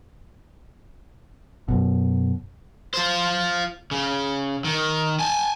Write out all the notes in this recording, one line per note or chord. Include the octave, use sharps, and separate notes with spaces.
F#2 B2
F4 C5
C#3
D#3
G#5 A5